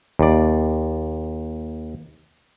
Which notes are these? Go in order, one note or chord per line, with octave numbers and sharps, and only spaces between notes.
D#2 D5